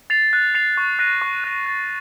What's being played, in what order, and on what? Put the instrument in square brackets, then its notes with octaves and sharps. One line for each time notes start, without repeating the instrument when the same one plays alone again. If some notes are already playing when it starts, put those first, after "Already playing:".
[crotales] A6 C7 F7
F#6
A6 C7 F7
C#6
F#6 A#6 D#7
C#6
F#6 A#6 D#7
A6